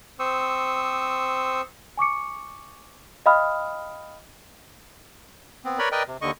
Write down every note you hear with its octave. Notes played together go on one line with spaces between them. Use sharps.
C4 C5 C#6 D#6 E6
G#5 C#6 D6 C#7
D#5 F5 G5 B5 D#6 F6
B3 C4
A#4 B4 C#5 D5 B5
A#4 B4 D5 D#5 G5
C3
D#2 D3 D#5 C#6